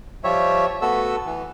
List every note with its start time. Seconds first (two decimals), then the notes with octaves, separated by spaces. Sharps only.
0.24 F3 G3 C#5 E5
0.82 A3 B3 F#4 A4 E6
1.26 E3